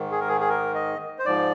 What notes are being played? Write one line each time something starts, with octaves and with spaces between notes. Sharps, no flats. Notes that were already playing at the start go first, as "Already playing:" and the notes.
Already playing: G#2 D#3
G#4
A#4
G#4
G#4
A#4
D#5
C5
G#2 F3 D5